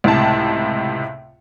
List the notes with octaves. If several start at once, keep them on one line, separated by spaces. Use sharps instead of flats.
C#2 A2 C3 A5